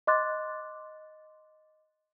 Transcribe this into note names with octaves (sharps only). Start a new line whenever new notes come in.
D#5 C6 D6 F#6 A6